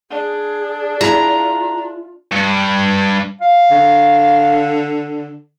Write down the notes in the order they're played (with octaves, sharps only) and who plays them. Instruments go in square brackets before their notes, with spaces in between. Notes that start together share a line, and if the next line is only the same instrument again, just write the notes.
[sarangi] D4 [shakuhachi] G#4
[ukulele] E4 G#4 [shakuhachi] F4 [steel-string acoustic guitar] A#5
[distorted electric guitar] G2
[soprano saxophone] F5
[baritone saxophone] D3